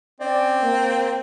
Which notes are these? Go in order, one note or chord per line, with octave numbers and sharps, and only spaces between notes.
C4 C#4 D5
A#3